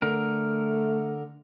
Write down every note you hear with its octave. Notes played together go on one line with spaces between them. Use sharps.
D3 A3 A#4